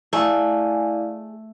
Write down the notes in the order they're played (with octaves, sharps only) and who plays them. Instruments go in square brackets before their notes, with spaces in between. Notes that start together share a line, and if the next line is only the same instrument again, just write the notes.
[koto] A3 [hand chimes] E4 D5 F5 [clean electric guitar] G#4